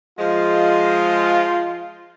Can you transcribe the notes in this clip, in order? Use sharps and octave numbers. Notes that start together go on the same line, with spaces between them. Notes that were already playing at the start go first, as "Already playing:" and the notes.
F3 G#3 F4